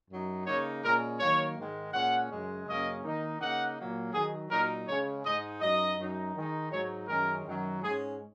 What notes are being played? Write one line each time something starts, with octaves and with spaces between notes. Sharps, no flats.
F#2 F#3 D#4
C#3 A#3 D#4 C#5
A#2 G#3 C#4 A#4
D#3 F#3 A#3 C#5
G#2 D#3 G#3
A#2 G#3 C#4 F#5
F#2 C#3 G#3
F#2 C#3 A#3 C#4 D#5
D#3 A#3 D#4
C#3 A#3 D#4 F#5
A#2 F#3 A#3
D#3 F#3 D#4 G#4
A#2 F#3 D#4 A#4
C#3 G#3 C#4 C#5
G#2 G#3 D#4 D#5
F#2 F#3 D#4 D#5
F#2 F#3 D#4
D#3 G#3 D#4
G#2 F#3 D#4 C#5
F#2 D#3 G#3 C#4 A#4
F#2 D#3 F#3
G#2 G#3 C#4 G#4